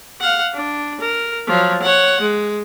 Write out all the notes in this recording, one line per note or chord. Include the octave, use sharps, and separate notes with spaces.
F5 F#5
D4
A#4
F3 F#3
C#5 F#5
G#3